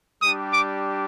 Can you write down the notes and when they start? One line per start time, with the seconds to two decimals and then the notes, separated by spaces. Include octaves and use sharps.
0.22 G3 D4 G4 D#6
0.53 D6